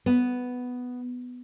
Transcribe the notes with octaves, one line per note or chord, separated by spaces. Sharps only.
B3